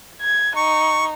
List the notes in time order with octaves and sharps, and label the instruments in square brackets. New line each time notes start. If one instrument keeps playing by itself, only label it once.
[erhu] G#6
[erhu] D#4 [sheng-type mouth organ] C#6